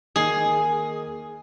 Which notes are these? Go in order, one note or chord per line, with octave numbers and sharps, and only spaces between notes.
D#3 A#3 G#4 C7